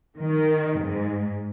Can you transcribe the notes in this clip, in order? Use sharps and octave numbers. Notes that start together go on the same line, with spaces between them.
D#3
G#2